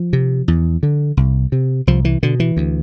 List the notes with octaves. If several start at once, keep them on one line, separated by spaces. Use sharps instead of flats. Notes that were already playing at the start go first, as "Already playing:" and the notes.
Already playing: F3
C3
E2
D3
C2
C3
C2 F3
E3
B2 D3
E3
D2